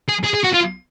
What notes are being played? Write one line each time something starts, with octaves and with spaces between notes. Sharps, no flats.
G#4
G#4
G#4
F#4
F4